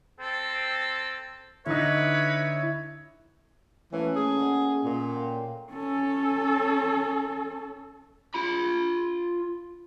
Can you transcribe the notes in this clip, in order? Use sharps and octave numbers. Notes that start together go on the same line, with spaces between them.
C4 A4
D3 D#4 E4 B4 C#5
E3 A3 A#3 C#4
G#4
D#5 F#5
A#2
G5 C6
C#4 A4
F4 B5